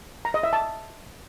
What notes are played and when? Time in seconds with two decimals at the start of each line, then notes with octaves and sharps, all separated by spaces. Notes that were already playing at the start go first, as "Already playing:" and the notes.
0.25 A#5
0.34 D#5
0.43 E5
0.53 A5